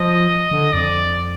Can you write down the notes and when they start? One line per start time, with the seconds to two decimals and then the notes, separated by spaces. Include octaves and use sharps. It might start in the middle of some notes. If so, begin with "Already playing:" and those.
Already playing: F3 D#5
0.51 D3
0.73 F2 D5